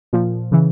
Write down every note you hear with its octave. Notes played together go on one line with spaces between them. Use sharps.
A#2 F3
C#3 E3